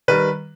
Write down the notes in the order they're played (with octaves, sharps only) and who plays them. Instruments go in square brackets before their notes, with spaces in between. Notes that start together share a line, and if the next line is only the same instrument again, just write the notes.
[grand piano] D#3 G3 B4